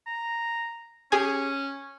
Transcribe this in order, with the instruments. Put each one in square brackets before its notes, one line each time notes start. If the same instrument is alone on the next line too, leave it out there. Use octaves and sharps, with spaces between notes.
[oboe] A#5
[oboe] C#4 [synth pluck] G4 G#4 G#5